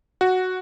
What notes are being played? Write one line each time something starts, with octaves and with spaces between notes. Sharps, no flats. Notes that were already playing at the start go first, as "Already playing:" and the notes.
F#4